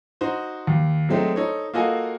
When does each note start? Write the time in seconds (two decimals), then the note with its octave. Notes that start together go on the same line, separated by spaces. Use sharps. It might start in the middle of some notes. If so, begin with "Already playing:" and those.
0.21 D#4 F#4 C5
0.67 D#2
1.09 F#3 G#3 A3 C4 D#4
1.36 D#4 A4 C5 C#5
1.74 A#3 F4 F#4 A4 D#5 G#5